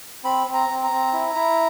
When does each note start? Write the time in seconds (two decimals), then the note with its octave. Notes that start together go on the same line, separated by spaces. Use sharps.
0.24 C4 B5
0.47 C4
0.54 A#5
0.69 C4
0.84 A#5
0.91 C4
1.13 E4
1.35 E4